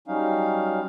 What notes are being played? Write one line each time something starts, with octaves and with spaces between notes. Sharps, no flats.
F#3 G3 C#4 D#4 F5